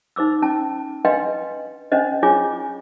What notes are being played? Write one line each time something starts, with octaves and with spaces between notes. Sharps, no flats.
D#4 C5 D6 E6
C#4 A5
D4 B4 D#5 F5 G5 C6
C#4 D4 C5 D#5
D4 F4 G#4 C#5 G#5 D6